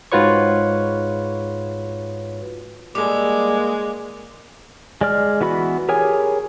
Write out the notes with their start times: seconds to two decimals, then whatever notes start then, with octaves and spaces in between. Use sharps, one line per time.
0.12 G#2 F4 F#4 B4 C#5 C#6
2.95 G3 G#3 A#3 A4 D6
5.01 G#3 D5 F6
5.41 E3 B3 F#4 B5
5.89 G4 G#4 A#4 C#5 G#5